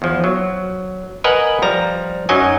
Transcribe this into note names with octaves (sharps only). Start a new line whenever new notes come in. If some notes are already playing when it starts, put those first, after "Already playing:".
E2 F3
F#3
A#4 B4 D#5 F#5 G#5
F3 G3 A#5
F#2 F#3 D#4 D#5 G#5